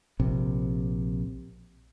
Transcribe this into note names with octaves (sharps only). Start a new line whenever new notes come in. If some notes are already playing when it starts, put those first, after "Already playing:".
A#1 C3